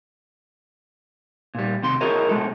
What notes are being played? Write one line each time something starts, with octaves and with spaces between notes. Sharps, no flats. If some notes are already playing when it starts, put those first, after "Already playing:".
A#2 G3
D#2 C3 C6
E4 F#4 G#4 A#4 C#5 D#5
B2 G#3 A4